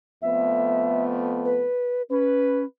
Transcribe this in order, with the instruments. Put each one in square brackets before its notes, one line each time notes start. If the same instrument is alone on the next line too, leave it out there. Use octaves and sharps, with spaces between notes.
[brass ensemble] F2 A3 B3 [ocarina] E5
[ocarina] B4
[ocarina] C#4 [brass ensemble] B4